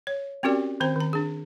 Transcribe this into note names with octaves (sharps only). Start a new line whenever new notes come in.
C#5
C4 C#4 F#4 G4 A#4 D5
D#3 C4 C5 A#5
D#3 A#5
D4 G#4